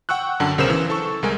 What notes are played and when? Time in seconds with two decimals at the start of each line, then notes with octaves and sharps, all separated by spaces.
0.09 F#5 G5 C#6 E6 F#6
0.40 F#2 D3 F#5 A5
0.58 B1 C#3 A#4 C5 E6 E7
0.70 E3
0.90 A4 C#6
1.23 C2 G#3 A#4 G#5